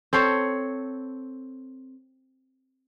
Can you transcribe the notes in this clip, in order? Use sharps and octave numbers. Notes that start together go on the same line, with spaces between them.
C4 A4 C5 C#5